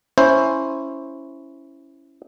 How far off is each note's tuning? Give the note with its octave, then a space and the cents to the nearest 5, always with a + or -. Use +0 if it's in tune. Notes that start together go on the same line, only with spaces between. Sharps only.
C#4 +0 E4 +0 C5 +10